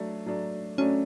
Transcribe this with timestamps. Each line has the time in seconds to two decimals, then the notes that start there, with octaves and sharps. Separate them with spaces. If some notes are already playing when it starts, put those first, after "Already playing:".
Already playing: F#3 A3 D4
0.26 F#3 A3 D4
0.78 F#3 A3 C#4 D4